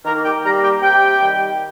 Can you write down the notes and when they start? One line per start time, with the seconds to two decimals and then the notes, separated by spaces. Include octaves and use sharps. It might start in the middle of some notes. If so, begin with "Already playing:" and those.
0.05 D#3 A#3 A#4
0.24 G4 G5
0.43 G3 A#3 A#4 A#5
0.62 G4 G5
0.81 C3 G4 G5
1.19 D#3 G3